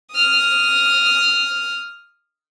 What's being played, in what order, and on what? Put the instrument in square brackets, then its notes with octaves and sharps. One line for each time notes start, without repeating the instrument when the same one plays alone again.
[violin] D#6 F6